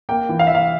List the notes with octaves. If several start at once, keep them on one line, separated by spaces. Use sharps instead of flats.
A#3 G5
E3
F5
E5
E3 F5